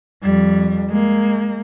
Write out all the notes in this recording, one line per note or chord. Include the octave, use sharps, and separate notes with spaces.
F2 G3
G#3 A#3